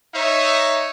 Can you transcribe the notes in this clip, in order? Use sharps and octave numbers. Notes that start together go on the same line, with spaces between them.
D#4 C#5 E5